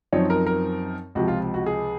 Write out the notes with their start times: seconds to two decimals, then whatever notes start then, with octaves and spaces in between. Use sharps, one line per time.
0.12 F#2 F3 C4 D#4 C#5
0.30 A#4
0.47 A#4
1.15 C#2 C3 F3 F#4
1.28 F4
1.54 F#4
1.66 G#4